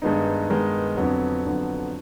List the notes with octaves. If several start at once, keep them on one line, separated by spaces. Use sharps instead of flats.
G2 D#3 G#3 B3 D#4
G2 D#3 G#3 B3 D#4
F2 D3 F#3 B3
F2 D3 F#3 B3